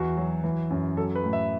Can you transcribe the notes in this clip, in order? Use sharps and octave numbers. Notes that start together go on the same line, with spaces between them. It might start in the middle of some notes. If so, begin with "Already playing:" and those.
Already playing: E2 F#4
F#3
E3
F#2
F#3 A4
B4
A2
E5